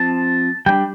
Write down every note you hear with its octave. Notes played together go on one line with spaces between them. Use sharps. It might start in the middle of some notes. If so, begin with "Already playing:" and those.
Already playing: F3 C4 A5
G3 D4 G5